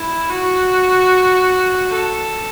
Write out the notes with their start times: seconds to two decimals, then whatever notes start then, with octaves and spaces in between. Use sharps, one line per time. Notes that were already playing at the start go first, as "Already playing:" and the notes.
Already playing: E4
0.30 F#4
1.90 A4